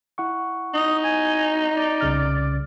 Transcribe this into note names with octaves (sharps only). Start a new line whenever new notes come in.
E4 F#5 C#6
D#4 D#6
G#5
D5
C2 C#3 F6